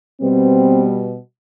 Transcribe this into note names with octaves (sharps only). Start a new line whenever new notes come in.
B2 G3 B3 C4